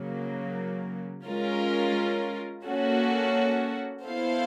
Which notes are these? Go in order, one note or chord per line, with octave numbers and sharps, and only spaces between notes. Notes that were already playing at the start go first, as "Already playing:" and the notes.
Already playing: C#3 F#3 A#3
G#3 C#4 F4 A#4
A#3 C#4 F#4 A4
B3 E4 A4 C5 F5